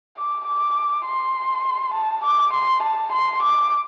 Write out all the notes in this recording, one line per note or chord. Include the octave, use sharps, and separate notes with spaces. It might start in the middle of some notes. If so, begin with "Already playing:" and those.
D6
D6
C6
A5
D6
C6
A5
C6
D6